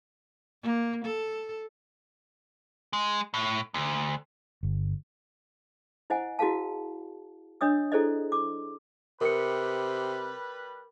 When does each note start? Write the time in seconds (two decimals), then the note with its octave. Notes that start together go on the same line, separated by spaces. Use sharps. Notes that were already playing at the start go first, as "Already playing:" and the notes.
0.62 A#3
1.05 A4
2.93 G#3
3.34 A2
3.74 D2
4.63 G1
6.10 E4 C5 D#5 F#5 G#5
6.39 E4 F#4 G#4 A#4 F5 A5
7.61 D4 C#5 D#5 D#6 E6
7.92 E4 G#4 A4 C5 D5 D#5
8.32 D6
9.21 C3 G3 A#4 B4 C#7